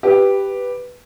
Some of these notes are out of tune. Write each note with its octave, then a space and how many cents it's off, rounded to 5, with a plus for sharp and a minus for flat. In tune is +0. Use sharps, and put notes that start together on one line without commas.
G4 +0 B4 +0